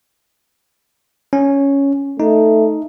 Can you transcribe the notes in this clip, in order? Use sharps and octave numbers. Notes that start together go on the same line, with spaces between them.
C#4
A3 D#4